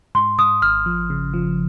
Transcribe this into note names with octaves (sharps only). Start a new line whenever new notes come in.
G#2 C6
G#2 D#6
G#1 F6
F3
C#3
F3